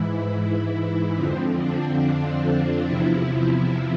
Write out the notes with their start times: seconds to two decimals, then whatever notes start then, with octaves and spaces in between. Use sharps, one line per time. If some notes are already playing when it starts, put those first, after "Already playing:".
Already playing: G#2 E3 E4
1.16 F2 D3 F3 C4
1.59 D4
2.01 D4
2.85 E2 C3 F3 E4